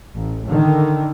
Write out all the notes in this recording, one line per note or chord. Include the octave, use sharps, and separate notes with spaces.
A1
D3 D#3